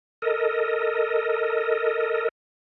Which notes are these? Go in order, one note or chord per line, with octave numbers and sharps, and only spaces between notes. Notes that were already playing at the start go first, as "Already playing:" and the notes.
A4 A#4 D#5